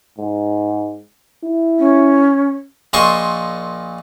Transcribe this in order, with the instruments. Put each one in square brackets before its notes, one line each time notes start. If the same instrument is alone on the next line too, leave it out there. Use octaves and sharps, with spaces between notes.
[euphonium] G#2
E4
[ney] C#4
[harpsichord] A#1 A#2 D#5 A5 C6 C#6